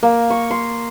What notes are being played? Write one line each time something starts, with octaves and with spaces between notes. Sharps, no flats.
A#3
C#6
C6